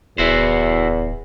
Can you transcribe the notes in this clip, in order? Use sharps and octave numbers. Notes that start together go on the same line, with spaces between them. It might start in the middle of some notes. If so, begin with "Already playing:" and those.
D1 E2 E4 F#4 C5